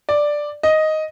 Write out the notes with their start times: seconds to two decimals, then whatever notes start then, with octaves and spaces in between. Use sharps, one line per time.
0.09 D5
0.63 D#5